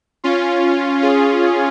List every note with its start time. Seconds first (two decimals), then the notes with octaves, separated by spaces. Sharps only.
0.24 C#4 F4
1.02 F4 G#4